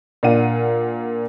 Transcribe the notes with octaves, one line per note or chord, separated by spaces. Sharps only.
A#2 D4 F5 F#5 D#7